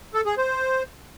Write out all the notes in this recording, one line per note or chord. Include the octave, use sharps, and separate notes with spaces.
A4
G#4
C5